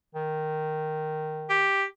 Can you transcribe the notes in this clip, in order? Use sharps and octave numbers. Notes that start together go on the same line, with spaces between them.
D#3
G4